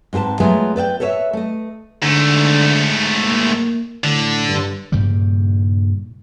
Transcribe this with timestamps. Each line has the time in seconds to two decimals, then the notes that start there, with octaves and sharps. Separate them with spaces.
0.13 G#2 C4 G#4 B4 A5
0.40 F#3 G#3 A3 B3 F4
0.76 B4 D5 E5 G5
1.00 A4 B4 C#5 D#5 E5
1.33 A3 D#5
2.03 G#2 D3 A3
3.24 A#3
4.04 A2 D3
4.48 G2
4.92 G2 A#2 C#3 G3